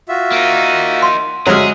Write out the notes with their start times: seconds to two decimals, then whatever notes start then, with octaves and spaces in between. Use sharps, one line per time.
0.09 F4 F#4 E5
0.32 A#3 D#4
1.02 C6
1.47 F#3 G#3 G#4 E5 F6